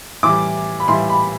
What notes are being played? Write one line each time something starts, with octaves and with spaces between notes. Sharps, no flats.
A2 E3 G3 D6
B5
A2 E3 G3 C6
B5